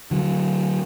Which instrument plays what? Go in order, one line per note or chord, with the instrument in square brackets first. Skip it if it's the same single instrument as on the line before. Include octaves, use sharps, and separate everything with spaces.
[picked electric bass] D3 F#3